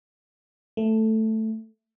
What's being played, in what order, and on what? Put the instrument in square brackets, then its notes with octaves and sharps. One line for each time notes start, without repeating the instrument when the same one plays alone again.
[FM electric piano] A3